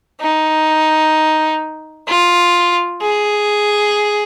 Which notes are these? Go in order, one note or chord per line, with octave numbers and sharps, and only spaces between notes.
D#4
F4
G#4